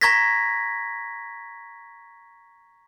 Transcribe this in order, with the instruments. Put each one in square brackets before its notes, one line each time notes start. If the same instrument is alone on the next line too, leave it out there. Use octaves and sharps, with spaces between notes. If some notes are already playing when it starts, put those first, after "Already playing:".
[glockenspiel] A#5 C#6 G#6 A#6 B6